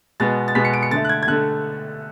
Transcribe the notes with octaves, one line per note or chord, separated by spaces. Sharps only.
B2 G#3 B3 A6
A6
B2 G#3 B3 B6
C#7
D7
C#7
D3 A3 A6
F#6
G#6
G#6
D3 A3 F#6